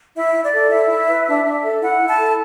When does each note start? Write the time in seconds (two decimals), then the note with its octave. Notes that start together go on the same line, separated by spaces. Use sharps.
0.16 E4 E5
0.35 E4
0.44 D5
0.54 A4
0.71 E4 E5
0.90 E4
1.09 B4
1.27 D4
1.45 D4
1.64 A4
1.82 E4 F#5
2.01 E4
2.09 A5
2.19 A4